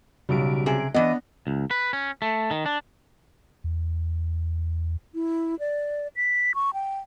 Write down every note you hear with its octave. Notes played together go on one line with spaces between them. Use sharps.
B1 C#3 F#3 G3 D7
C3 G#4
E3 B3 D4 D#5
C#2
B4
C#4
A3
D#3
D4
E2
E4
D5
B6
C#6
G5